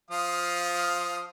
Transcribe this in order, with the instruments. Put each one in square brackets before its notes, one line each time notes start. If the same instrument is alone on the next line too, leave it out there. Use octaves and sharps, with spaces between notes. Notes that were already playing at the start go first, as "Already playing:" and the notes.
[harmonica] F3 F5 D#6